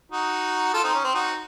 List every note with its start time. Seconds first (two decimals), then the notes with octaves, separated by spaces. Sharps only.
0.11 D#4 F#4
0.74 F4 A4
0.84 C4 D#4
0.94 C#4
1.04 C4
1.14 D#4 F#4